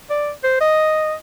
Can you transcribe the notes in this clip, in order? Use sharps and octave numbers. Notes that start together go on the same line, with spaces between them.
D5
C5
D#5